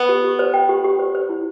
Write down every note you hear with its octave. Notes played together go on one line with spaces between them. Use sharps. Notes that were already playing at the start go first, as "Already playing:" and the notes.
Already playing: B3
G4
G4
C5
G5
G4
G4
C5
C5
E4